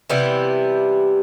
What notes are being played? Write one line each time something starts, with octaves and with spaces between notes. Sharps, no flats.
C3 E3 G3 B3 E4 G4